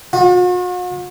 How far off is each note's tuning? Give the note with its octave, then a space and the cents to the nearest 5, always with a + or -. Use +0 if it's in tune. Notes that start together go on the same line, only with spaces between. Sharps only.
F#4 -45